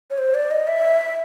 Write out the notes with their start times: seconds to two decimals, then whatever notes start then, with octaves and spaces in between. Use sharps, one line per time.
0.10 C#5
0.18 C5
0.35 D5
0.51 D#5
0.68 E5